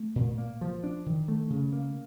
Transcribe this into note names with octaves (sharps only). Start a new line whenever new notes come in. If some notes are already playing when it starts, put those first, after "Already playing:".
Already playing: A3
A#2
A#3
F3
D4
D#3
A3
C#3
A#3